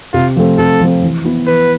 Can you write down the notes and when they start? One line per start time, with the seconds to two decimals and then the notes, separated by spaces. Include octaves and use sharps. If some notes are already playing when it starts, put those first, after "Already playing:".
0.13 C3 F4
0.36 F3 A3 C4
0.58 C3 A4
0.81 F3 A3 C4
1.02 E3
1.24 B3 E4
1.47 E3 B4